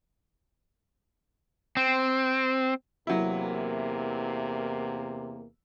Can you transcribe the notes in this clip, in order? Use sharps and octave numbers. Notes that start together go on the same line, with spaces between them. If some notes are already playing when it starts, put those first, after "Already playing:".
C4
E2 C3 F#3 A#3 E4